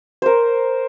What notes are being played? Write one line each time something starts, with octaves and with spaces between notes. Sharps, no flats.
A#4 C5